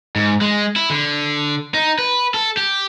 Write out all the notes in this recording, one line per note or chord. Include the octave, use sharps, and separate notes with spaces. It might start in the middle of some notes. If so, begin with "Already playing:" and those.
G#2
G#3
E4
D3
D#4
B4
A4
G4